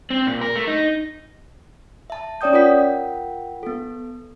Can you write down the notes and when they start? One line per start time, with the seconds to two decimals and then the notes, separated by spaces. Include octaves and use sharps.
0.10 C4
0.27 A#2
0.41 A#4
0.56 A3
0.67 D#4
2.10 E5 A5
2.41 C#4 C#5 D5 G5 D#6 G6
2.53 F4 A#4 F#5 G5 B6
3.63 B3 A4